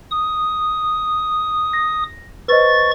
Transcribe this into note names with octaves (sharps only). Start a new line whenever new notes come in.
D#6
A#6
B4 C5 D#5 C#6 A6